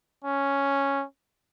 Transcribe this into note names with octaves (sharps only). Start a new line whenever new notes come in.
C#4